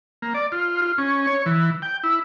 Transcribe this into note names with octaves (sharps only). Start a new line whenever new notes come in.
A#3
D5
F4
F4
C#4
C#5
E3
G5
E4